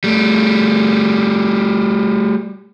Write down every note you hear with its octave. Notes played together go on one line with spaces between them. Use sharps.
G3 A3